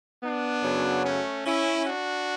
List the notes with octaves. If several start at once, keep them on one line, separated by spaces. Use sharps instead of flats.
B3 D4
F#2 C#3 F#3
A3 C#4
C#4 E4
D4 F#4